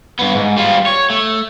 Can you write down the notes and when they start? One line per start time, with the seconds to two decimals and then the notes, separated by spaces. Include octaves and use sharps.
0.19 G2 B3
0.35 G#2
0.57 G3 F4
0.86 C#5
1.10 A3